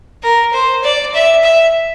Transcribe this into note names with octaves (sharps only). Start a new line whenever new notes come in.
A#4
C5
D5
E5
E5